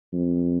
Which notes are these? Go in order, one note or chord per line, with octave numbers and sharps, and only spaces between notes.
F2